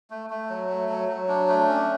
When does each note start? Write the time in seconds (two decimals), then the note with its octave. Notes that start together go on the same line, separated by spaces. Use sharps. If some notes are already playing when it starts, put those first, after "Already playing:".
0.10 A3
0.30 A3
0.50 F#3
0.69 A3
0.89 F#3
1.08 F#3
1.28 D4
1.48 A3
1.69 C#4